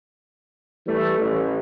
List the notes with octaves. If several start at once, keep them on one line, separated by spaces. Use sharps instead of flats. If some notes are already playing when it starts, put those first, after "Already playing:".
E3 G3 A3
A1